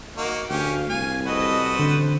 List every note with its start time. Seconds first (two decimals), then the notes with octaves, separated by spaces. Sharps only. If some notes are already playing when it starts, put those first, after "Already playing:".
0.17 A#3 D#4 F#4
0.50 D2 C#4 G4 F5
0.90 C2 G#5
1.26 G3 C4 F#4 A4 B4 D#5
1.79 A1 D3 C5